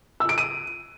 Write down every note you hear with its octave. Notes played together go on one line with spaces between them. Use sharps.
E6
D7
D#7